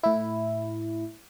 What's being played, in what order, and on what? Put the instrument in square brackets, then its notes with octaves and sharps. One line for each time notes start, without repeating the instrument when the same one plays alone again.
[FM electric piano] A2 E4